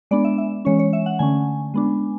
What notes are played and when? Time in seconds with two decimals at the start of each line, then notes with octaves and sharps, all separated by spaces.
0.11 G#3 B3 D4 D5
0.25 E5
0.38 E5
0.65 E3 G#3 C#4 C#5
0.79 C#5
0.93 E5
1.06 F#5
1.19 D3 A3 C#4 G#5
1.74 G#3 B3 D4